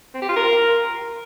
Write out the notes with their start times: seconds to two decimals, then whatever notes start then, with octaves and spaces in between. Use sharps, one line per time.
0.14 C4
0.22 G4
0.29 F4
0.36 A#4